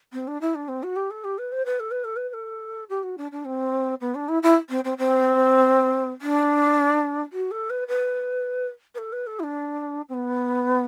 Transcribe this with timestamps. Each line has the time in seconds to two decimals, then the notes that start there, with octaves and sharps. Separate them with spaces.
0.13 C4
0.28 D4
0.41 E4
0.55 D4
0.68 C4
0.83 F#4
0.96 G4
1.10 A4
1.24 G4
1.38 B4
1.52 C5
1.66 B4
1.80 A4
1.91 B4
2.04 A4
2.16 B4
2.29 B4
2.34 A4
2.89 G4
3.03 F#4
3.18 D4
3.32 D4
3.45 C4
4.01 B3
4.15 D4
4.29 E4
4.43 E4
4.69 C4
4.84 C4
4.98 C4
6.22 D4
7.33 F#4
7.51 A4
7.70 B4
7.88 B4
8.95 B4
8.98 A4
9.13 B4
9.27 A4
9.40 E4
9.43 D4
10.09 C4
10.14 B3